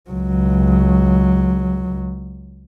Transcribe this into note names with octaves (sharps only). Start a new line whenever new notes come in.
C#2 F#3